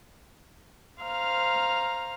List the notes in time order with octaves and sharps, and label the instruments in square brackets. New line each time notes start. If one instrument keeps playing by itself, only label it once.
[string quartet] C5 F5 A#5 F6